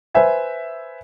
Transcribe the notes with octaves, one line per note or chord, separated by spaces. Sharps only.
B4 C5 E5 G#5